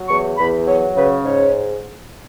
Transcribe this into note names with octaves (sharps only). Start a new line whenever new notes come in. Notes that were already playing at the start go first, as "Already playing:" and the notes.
Already playing: F#3
E2 C#6
E2 B5
F#3 C#5
C#3 B4
G#2 C#5